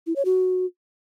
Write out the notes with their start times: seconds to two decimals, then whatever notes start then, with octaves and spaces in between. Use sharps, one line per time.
0.07 E4
0.16 C#5
0.25 F#4